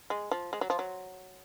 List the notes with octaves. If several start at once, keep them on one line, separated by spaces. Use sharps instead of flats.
G#3
F3
G#3
F#3
F3
F#3